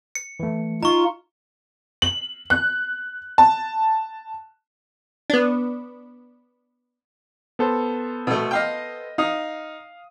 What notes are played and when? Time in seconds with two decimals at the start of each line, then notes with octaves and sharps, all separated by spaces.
0.15 C#7
0.40 E3 A3
0.83 D#4 F4 A#5 C#6
2.02 F#7
2.50 F#6
3.38 A5
5.30 B3 D4
7.59 B3 A4 C5
8.27 B2 A3
8.51 D#5 F5 G5
9.18 D#4 F5 D#6